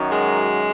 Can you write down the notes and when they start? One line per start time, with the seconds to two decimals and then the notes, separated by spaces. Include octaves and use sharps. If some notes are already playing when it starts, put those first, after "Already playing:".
Already playing: F#2 D#3 F#3
0.09 G#3